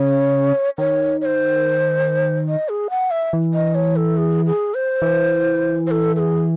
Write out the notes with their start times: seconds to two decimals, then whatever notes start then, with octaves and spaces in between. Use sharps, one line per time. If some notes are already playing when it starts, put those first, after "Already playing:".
Already playing: C#3 C#5
0.78 D#3 C#5
1.21 C#5
1.25 C5
2.48 D#5
2.69 G#4
2.90 F#5
3.11 E5
3.33 E3
3.54 D#5
3.75 C#5
3.96 A4
4.17 G#4
4.46 G#4
4.74 C5
5.02 E3
5.87 C5
5.91 A4
6.16 A4
6.19 G#4